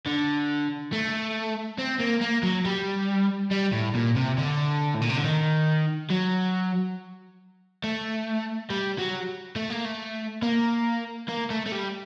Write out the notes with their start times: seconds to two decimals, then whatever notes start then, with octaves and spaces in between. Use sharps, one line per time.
0.06 D3
0.93 A3
1.79 C4
2.00 A#3
2.22 A#3
2.43 F#3
2.65 G3
3.51 G3
3.73 A2
3.95 A#2
4.16 C3
4.38 D3
4.94 A2
5.02 A#2
5.09 C3
5.16 D3
5.24 D#3
6.10 F#3
7.84 A3
8.70 G3
8.98 F#3
9.56 A3
9.70 A#3
9.84 A3
10.43 A#3
11.29 A#3
11.50 A3
11.66 A3
11.72 G3